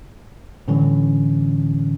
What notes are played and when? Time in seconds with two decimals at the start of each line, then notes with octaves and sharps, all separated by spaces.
0.68 A2 D3 E3 G3 C#4